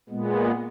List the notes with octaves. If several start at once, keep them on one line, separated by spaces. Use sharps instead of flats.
A#2 G#3 B3